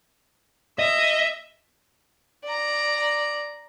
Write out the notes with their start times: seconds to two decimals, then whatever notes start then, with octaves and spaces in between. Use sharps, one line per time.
0.79 D#5 E5
2.44 D5 A#5